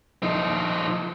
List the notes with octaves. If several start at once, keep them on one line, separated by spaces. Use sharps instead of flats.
F3 D#4